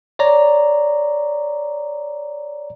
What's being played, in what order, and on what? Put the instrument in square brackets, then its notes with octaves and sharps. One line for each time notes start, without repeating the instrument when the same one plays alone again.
[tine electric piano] C#5 D5 A#5